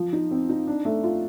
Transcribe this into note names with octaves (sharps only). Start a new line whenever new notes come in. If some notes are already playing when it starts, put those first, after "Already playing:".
Already playing: F3
D#4
C4
D#4
D4
A3
F4